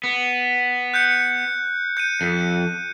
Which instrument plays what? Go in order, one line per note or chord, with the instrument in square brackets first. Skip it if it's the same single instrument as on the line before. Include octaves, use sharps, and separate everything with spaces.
[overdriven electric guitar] B3
[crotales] F#6 G6 C#7
G6 C#7 D#7
[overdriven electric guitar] F2